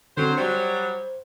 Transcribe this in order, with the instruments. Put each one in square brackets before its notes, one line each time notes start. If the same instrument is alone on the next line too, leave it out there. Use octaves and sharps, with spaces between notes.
[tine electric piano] D3 C4 [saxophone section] F#3 C5
[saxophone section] F#3 G3 [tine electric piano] C5